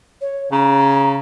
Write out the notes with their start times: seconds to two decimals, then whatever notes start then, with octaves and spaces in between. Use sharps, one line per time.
0.21 C#5
0.52 C#3 A#5